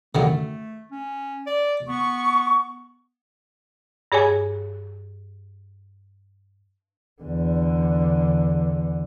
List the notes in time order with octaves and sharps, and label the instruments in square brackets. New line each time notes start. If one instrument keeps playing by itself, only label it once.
[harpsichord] F#2 D3 D#3 [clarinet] A3
[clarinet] C#4
D5
[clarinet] B3 [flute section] C#6
[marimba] G2 G#4 C#5 G#5
[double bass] E2 D3